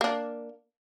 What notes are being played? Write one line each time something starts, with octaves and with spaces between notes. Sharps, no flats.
A#3 D4